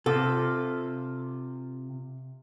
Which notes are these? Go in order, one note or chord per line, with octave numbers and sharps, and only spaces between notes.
C3 F4 A4